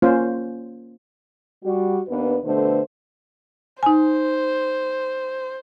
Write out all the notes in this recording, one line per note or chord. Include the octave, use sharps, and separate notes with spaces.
A#3 C#4 F4 C5
G3 F#4
D#2 B3 D4 B4
B2 D3 A3 A4 B4 C5
D#4 C5 G#5